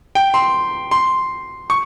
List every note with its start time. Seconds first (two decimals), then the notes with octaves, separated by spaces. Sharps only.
0.15 G5
0.34 C6
0.91 C6
1.70 C#6